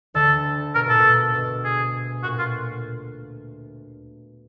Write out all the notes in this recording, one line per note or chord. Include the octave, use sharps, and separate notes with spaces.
D2 D3 A4
B2 A#4
A#2 A4
B2
B2
G#4
A#2 F#4
F4